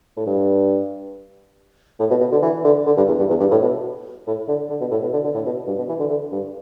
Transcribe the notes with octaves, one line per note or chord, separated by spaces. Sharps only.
A2
G2
A2
B2
B2
D3
E3
D3
D3
G2
E2
G2
E2
G2
A2
B2
A2
D3
D3
B2
A2
B2
D3
D3
A2
B2
G2
B2
E3
D3
D3
G2